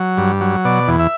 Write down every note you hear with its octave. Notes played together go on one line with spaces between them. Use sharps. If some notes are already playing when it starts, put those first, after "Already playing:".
Already playing: F#3
G2
F#3
B2 D5
E2
E5